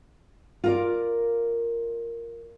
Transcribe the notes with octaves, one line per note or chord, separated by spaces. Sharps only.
F4 A#4 D5